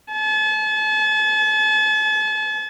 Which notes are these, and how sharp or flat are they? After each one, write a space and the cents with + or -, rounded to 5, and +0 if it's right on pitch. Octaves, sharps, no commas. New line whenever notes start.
A5 -40